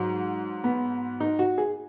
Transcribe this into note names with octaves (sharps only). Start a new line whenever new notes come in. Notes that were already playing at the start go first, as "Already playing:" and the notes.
Already playing: G#2 F#3
B3
D#4
F#4
G#4